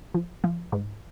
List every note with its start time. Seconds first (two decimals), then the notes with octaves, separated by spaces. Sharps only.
0.14 F3
0.44 F3
0.72 G#2